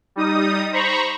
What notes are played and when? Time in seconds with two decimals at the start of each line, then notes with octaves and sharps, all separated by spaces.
0.16 G3 D#4 D#6
0.72 C5 A#5 B5 C#6